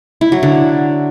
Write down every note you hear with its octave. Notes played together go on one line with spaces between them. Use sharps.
E4
F#3
D3